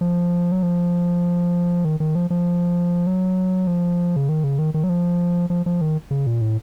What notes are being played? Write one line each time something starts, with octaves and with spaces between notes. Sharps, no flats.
F3
F#3
F3
D#3
D#3
F3
F3
F#3
F3
C#3
D#3
C#3
D#3
D#3
F#3
F3
F3
F3
D#3
C#3
A#2
A2